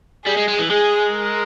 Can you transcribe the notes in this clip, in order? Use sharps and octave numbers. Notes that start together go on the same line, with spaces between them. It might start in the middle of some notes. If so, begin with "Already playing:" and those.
G3 G#4
G#3
G#3
E3
G#3 G#4
A#4